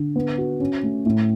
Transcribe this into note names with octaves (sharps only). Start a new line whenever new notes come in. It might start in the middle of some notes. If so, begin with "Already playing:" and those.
Already playing: D3
B3
F#4
C#4
A3
A2